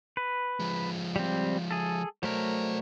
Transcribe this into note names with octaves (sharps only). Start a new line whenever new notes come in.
B4
F3 G#3
G3 C4
G#4 A4
F#3 A3 A#4 C5 D5